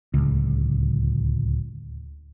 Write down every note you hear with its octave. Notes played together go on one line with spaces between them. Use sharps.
D1 C#2